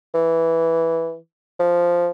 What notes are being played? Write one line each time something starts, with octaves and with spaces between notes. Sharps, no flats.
E3
F3